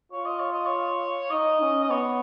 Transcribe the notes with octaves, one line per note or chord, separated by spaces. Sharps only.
F4 C#5
D#5
C#5
D#5
C#5
D#4 D#5
C#4
D#5
B3 C#5